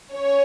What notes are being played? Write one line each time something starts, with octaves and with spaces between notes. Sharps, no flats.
C#4 C#5